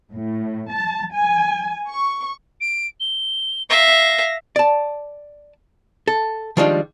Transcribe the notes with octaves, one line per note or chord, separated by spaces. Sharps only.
A2
A5
G#5
C#6
D7
G7
E5 F5 A#6
D5 A5
A4
D#3 F3 G3 G#3 D4 F4